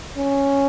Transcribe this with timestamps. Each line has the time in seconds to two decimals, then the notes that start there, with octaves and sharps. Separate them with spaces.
0.18 C#4